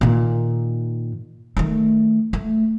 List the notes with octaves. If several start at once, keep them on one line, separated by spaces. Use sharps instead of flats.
A#2 D#3
D#3 A3
A3